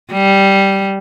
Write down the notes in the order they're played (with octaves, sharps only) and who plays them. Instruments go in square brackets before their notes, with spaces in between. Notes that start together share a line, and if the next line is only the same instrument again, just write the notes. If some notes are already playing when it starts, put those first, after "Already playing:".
[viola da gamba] G3